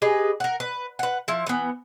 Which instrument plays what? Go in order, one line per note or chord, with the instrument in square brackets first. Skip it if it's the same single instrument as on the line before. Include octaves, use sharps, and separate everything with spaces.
[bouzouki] G4 G#4 B4 D#5
A#4 F#5
B4
B4 F#5
F3 E4
E3 B3